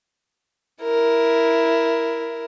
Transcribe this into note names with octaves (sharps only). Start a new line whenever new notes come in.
E4 A#4